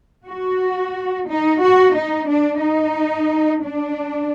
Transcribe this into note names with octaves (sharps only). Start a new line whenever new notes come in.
F#4
D#4
F#4
D#4
D4
D#4
D4